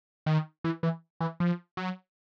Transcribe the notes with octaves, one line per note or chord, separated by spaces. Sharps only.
D#3
E3
E3
E3
F3
F#3